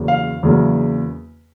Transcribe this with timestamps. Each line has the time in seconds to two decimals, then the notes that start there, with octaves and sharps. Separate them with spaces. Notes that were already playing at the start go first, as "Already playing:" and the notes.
Already playing: E2 C#3 F#3 A#3
0.08 F5
0.43 E2 C#3 F#3 A#3